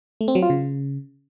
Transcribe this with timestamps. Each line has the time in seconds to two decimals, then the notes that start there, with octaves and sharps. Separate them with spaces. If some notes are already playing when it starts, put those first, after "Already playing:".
0.21 A3
0.28 C4
0.35 F#3
0.42 F4
0.50 C#3